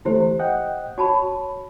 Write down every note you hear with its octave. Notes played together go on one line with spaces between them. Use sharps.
D2 E3 A3 E4 G4 C5
D#5 F#5 G5
F#4 C#5 A5 B5